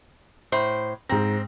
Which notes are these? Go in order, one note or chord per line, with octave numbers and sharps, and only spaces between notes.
A2 C5
G#2 C4 A#5 A#6